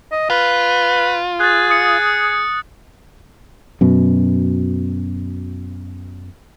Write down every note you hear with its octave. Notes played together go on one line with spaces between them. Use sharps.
D#5
F4 B4
G#4 F#6 A6
D#6 C#7
F#2 B2